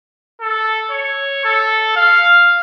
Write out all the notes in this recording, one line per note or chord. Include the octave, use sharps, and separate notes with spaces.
A4
C#5
A4
F5